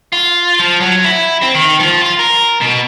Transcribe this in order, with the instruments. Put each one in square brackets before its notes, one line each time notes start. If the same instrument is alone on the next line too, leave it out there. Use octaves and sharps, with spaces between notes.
[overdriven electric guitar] F4
F3
F#3
E4
C4
D#3
F3
F4
A#4
B2